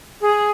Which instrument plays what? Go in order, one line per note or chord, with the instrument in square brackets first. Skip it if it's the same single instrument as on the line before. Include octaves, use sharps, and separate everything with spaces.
[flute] G#4